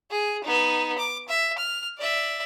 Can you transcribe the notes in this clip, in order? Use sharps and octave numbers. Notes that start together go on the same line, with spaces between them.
G#4
B3 D#4
D6
E5
F6
D5 E5